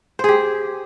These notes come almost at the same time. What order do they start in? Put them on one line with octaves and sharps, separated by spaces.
C5 G#4 G4